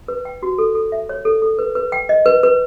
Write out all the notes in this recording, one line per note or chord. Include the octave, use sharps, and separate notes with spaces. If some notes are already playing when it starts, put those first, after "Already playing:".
B4
G5
F#4
A4
A4
E5
C#5
A4
A4
B4
B4
G5
D#5
B4
B4